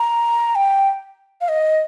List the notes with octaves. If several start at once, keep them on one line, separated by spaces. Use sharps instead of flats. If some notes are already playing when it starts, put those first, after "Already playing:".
Already playing: A#5
G5
F5
D#5